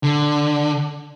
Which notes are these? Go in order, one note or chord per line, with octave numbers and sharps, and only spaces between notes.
D3